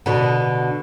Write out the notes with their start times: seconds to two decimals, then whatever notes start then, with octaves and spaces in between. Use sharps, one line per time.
0.06 B2 D3